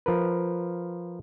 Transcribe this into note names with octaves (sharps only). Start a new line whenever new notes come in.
F3 A#4 B4